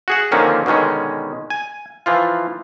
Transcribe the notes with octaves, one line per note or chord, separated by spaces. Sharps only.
F#4 G#4 F#5
D3 D#3 F3 A#3 C4 C#4
B2 D3 D#3 G#3 C#4
G#5
E3 F3 F4